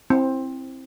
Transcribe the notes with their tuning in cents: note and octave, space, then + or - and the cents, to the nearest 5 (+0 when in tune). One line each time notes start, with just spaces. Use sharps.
C4 +15 E4 +0